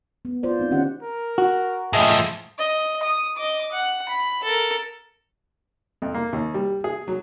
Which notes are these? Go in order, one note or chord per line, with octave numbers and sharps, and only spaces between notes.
B3
F4 C5 D5
C4 D#4
D3 D#3 C#4 G4 F#5
A#4
F#4
A2 F3 G#4 D#5 E5
D#5
D#6
D#5 D6
F#5
B5
A4 A#4
F2
A#3
D#2
G3
G#4
F#3